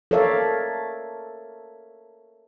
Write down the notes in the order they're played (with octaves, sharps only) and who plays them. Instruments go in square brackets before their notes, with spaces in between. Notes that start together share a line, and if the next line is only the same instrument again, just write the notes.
[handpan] A4 A#4 C#5 D5 E5 F5